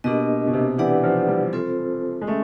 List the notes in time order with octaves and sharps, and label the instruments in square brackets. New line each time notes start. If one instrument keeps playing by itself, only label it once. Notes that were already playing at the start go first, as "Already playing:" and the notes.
[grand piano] B2 [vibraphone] A#3 D4 G4 A#4 D#5
[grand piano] B2
C3
[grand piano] E3 [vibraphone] D4 G4 B4 D5 F#5
[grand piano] F3
G3
[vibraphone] C4 F4 A4 C5
[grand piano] G#3
[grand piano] A3 [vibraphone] C#4